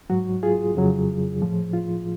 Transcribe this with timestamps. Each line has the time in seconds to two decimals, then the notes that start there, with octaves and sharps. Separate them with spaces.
0.10 G#2 F#3 F#4
0.43 F4 G#4
0.75 F2 C#3 F#3
1.42 A2 F3
1.73 F4